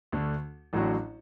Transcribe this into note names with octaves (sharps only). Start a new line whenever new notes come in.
D2 D3 A3 D4
A1 A2 F#3 D4 F#4